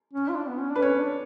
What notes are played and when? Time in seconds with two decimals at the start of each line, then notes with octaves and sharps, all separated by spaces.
0.13 C#4
0.29 F4
0.35 D4
0.48 B3
0.58 C#4
0.71 D4 B4
0.82 C#4 C#5
1.00 D4